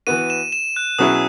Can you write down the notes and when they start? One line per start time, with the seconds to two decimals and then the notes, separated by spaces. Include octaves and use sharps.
0.07 E3 B3 F#4 D#7
0.30 E7
0.52 E7
0.76 F#6
0.98 B2 F#3 C#4 E4 G#4 D#6